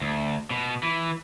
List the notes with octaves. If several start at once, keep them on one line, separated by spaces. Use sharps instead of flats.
D2
B2
E3